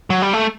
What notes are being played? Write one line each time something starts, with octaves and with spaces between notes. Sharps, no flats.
F#3
G3
A3